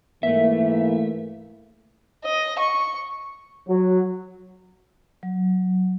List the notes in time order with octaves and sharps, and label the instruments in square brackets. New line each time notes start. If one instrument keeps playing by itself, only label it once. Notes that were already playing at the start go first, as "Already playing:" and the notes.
[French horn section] G#2 E3 A#3 [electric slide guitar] A3 E5
[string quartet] D#5
C#6
[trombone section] F#3
[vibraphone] F#3